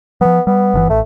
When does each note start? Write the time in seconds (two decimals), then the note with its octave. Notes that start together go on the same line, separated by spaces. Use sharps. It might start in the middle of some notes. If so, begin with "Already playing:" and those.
0.21 F3 F#3 B3
0.47 G3 B3
0.74 G1 B2 E3
0.90 A1 A3